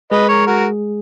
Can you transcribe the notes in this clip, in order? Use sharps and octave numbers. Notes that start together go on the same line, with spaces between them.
G#3 G#4 B4 D#5
A#4 C#5
F#4 A#4